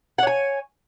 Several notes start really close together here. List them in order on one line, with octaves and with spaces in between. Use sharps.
F#5 C#5 G#5